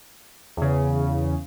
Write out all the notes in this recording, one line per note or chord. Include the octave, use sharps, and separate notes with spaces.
E2 C#3